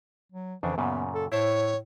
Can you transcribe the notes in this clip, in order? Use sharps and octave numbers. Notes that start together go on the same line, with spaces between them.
F#3
F2 C#3 E3 D4
F#2 A#2 C#3 B3
A4
A2 E4 C5 C#5 A5